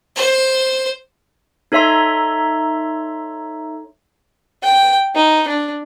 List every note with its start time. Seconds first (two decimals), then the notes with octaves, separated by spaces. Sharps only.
0.16 C5
1.72 D#4 A4 C#5 E5 A#5 C6
4.63 G5
5.15 D#4
5.48 D4